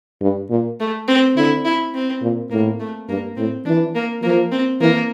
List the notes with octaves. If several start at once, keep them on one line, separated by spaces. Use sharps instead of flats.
G2
A#2
A3
C4
D3 E4
E4
C4
A#2
A2 A#3
A3
G2 A#3
A2 C4
E3 D4
A#3
F3 A#3
C4
E3 A#3